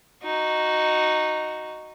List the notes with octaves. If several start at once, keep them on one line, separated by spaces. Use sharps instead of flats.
D#4 F#4